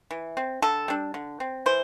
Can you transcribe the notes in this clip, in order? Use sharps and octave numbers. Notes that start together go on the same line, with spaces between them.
E3
C4
D3 A4
G3 D4
D3
C4
E3 C5